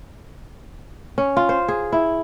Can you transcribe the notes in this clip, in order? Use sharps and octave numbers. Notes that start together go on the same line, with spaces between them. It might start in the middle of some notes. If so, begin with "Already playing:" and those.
C#4
F4
C5
G#4
E4